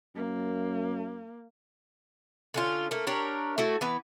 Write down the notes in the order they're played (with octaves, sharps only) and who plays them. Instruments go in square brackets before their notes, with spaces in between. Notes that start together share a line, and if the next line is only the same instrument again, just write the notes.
[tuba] F#2 [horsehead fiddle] A#3
[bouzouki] D3 C#4 F4
A3 A#3
D4 G4 A#4 C#5
A3 E4 F#4
E3 B3 B4